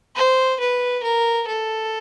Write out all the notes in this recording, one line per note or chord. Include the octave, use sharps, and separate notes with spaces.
C5
B4
A#4
A4